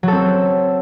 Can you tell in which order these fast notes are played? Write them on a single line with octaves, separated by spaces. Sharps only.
F#3 A4 C4